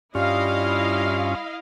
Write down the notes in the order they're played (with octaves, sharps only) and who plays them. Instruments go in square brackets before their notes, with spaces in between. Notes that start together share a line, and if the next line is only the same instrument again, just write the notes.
[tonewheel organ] G2 C#4 F4 [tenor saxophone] G3 [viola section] E4 D#5 F5